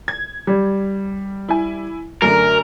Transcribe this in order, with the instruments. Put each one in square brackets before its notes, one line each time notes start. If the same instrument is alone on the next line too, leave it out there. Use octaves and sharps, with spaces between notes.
[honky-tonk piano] G#6
[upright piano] G3
[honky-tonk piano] E4 G#5
[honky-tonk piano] F#2 D3 A3 [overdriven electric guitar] A#4